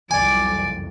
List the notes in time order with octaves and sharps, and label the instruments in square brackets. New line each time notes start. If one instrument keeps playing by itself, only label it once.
[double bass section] F#1 C2 F2 [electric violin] D5 D6 [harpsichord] G#5